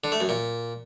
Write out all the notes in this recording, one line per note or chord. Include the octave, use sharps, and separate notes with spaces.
D3
A3
F#2
A#2